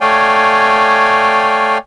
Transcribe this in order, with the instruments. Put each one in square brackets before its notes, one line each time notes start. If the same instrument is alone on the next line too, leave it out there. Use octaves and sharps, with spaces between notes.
[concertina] A3 C#5 D5 F5 G5 G#5